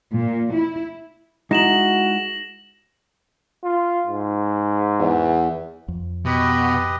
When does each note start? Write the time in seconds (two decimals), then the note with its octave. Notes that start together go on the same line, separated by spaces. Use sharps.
0.16 A#2
0.52 E4
1.51 G#3 D#4 E4 F#4 A#6 E7 F#7
3.64 F4
4.07 G#2
5.00 E2
5.88 F2
6.26 B2 G4 B4 D#5